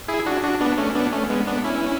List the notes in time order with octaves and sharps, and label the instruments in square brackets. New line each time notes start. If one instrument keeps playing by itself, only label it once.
[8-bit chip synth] E4 G#4
D4 F#4
D4 F#4
B3 D4
A3 C#4
B3 D4
A3 C#4
G#3 B3
B3 D4
C#4 E4